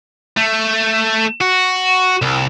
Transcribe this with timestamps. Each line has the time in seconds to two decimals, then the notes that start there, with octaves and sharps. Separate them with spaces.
0.37 A3
1.41 F#4
2.22 C2